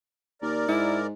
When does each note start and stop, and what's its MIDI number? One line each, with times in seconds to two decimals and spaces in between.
0.42 0.67 39
0.42 1.07 70
0.42 1.07 74
0.68 1.13 44
0.68 1.01 64